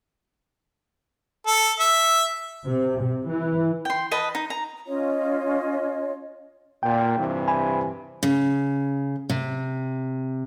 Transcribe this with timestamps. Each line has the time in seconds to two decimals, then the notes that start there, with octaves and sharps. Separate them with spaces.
1.47 A4
1.80 E5
2.66 C3
2.99 C3
3.29 E3
3.85 G5 C6
4.11 B4 D#5 A5
4.35 D#4
4.50 A#5
4.86 C#4 F4 C#5 D#5
6.83 A#2 G5
7.17 G2 C3 E3
7.48 G#5 B5
8.23 C#3
9.30 C3